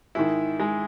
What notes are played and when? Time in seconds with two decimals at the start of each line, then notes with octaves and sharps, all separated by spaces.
0.15 G#2 D#3 E4
0.60 G#3